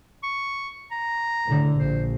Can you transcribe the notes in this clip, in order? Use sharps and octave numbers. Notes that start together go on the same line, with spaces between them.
C#6
A#5
A2 D3
A#1 C5